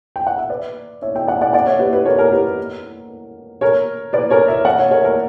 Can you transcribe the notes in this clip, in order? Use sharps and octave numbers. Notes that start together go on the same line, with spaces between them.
G5
F#5
E5
B4 D5
C#5 E5
E5 G5
D5 F#5
D5 F#5
D5 F#5
C#5 E5
G4 B4
G4 B4
A#4 C#5
A#4 C#5
G4 B4
A#4 C#5
B4 D5
A#4 C#5
C#5 E5
D5 F#5
C#5 E5
A#4 C#5
A#4 C#5